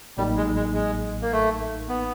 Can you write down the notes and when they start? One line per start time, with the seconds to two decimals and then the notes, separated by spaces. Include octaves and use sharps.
0.17 A1 A2 F#3 G3 A#3 D#4
0.37 G#3
0.56 G#3
0.74 G#3
1.22 A#3
1.32 A3
1.89 B3